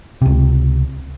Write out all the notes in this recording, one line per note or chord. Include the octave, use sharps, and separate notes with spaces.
C#2 C3